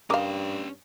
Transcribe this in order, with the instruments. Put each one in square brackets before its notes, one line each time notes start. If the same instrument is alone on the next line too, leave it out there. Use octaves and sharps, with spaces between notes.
[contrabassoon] G2 [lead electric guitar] C#4 G5 [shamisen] A#4 F5 [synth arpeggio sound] A#5 D6 D#6